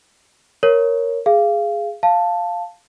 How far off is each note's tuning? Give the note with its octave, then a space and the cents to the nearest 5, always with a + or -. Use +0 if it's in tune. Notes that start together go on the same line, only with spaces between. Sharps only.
A#4 +0 C#5 +0
G#4 +0 F5 -20
F5 +0 A5 +0